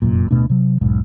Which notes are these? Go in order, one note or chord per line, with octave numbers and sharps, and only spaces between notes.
F1 F#2 A#2
D1 B2 A3 D4
C3 F#3
E1 B1 G#2